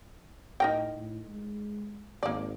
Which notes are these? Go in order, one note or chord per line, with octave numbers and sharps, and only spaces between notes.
A2 D#4 A#4 G5
A2
G#3
G#1 A#3 D5